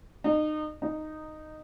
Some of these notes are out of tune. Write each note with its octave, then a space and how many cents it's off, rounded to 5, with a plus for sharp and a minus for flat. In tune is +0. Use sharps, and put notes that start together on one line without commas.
D#4 -25
D#4 -5